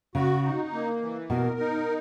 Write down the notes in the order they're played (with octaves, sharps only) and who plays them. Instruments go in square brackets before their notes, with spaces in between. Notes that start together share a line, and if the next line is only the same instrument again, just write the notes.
[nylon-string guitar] C#3 [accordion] F#4
[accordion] D#4
A#3
E3
[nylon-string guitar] B2 [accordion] A#4
[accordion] D#4